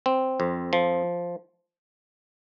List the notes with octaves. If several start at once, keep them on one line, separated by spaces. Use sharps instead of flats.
C4
F2
F3